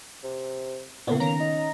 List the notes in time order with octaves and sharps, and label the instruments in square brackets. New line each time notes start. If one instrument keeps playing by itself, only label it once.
[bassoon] C3
[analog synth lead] A#2 [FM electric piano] C#3 B3
[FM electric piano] D#3 C#4 [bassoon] A#3 [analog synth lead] A#5
[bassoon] D#4